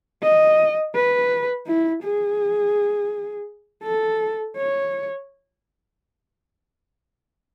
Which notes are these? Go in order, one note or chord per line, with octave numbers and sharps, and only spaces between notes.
D#5
B4
E4
G#4
A4
C#5